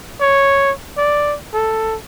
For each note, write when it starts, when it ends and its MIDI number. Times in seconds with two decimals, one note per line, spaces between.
0.21 0.72 73
0.97 1.35 74
1.54 1.96 69